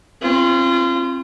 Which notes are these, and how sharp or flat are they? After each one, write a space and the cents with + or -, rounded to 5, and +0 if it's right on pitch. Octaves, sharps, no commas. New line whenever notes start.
C4 +35 F4 -30